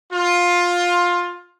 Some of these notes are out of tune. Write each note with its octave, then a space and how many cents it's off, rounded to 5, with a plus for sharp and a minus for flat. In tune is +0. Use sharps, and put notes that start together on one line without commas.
F4 +15